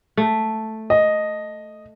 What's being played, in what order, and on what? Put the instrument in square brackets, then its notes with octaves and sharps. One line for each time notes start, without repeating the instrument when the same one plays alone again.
[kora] A3
[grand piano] D#5